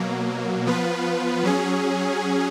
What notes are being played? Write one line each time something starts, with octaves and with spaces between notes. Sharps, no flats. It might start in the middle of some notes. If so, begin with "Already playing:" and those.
Already playing: B2 F#3 A#3
F3 B3 F4 B4
F#3 C#4 G#4